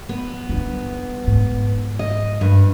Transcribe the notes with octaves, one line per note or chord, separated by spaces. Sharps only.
B3
G1 G3
G#2
D#5
G2